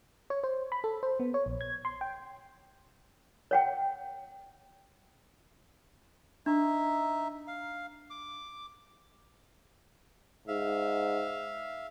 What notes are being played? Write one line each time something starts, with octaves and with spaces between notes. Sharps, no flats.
C#5
C5
B5
A4
C5
B3
C#5
A#1
G#6
C6
G5
C#5 F#5 G5
D4 D#4 E5
F5
D6
G#2 E5 F5